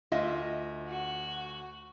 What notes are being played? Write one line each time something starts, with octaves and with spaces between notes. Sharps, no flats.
D2 F4 D#5 E5
F#4